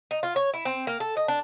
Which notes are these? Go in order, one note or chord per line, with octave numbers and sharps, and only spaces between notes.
D#4
F4
C#5
E4
C4
A#3
A4
D#5
D4